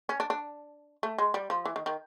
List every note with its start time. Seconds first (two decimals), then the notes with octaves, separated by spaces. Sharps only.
0.09 C#4
0.20 D4
0.30 D4
1.03 A3
1.18 G#3
1.34 G3
1.50 F3
1.65 E3
1.76 D#3
1.86 D#3